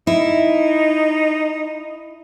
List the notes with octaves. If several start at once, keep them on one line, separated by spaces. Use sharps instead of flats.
D#4 E4